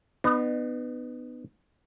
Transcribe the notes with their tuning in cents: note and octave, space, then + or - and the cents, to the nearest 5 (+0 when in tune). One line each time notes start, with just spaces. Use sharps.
B3 +10 D#4 -40 D#5 +0